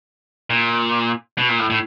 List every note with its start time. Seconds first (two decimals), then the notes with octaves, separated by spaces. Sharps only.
0.50 A#2
1.38 B2
1.49 A#2
1.59 A2
1.70 A2